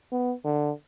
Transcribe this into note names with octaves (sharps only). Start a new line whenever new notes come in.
B3
D3